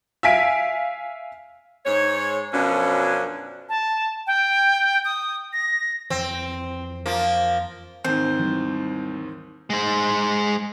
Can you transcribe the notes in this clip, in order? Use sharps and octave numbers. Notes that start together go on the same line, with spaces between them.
E5 F5 G#5 B6 D7
G#2 C#5
F#2 B2 F3 C#4 D4
A5
G5
D#6
A#6
F2 E3 C4
F3 A#3
D#2 G#2 C4 C5
E3 G3
G#3 C5